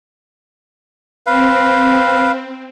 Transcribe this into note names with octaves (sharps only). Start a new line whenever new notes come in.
C4 B4 F5